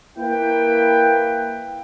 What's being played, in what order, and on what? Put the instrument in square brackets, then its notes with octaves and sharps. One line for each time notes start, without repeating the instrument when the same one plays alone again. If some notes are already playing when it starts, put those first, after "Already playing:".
[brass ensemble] A#3 E4 B4 G5